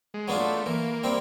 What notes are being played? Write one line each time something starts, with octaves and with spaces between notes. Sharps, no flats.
G#3
F#3 B3 D4 F4
A3
E3 A#3
G3 C4 E4